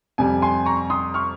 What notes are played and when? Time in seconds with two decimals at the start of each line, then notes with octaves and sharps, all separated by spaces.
0.18 F2 C3 G3 G#5
0.42 G#5 C6
0.66 A#5 C#6
0.90 C6 D#6
1.14 C#6 F6